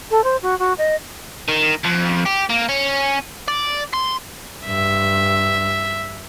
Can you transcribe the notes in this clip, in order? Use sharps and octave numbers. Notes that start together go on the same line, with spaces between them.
A4
C5
F#4
F#4
D#5
D#3
F2
G4
A#3
C#4
D5
C6
G2 E5